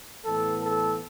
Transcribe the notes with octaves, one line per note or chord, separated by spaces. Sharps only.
A2 E3 B3 A4
A4